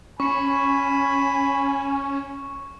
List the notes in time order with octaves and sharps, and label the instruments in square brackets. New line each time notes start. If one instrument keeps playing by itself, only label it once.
[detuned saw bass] C#4 [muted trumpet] G#5 [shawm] B5 [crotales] C#6 C#7